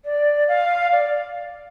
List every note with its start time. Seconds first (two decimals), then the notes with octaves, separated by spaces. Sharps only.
0.05 D5
0.48 F5
0.92 D5